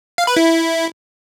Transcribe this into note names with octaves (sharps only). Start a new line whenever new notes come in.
F5
B4
E4